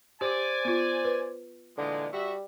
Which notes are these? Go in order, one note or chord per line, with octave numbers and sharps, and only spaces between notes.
G4 C5 D5 G#5 D6
B3 F4
B4
A#2 D3 E3 G#3
G3 F#4 E5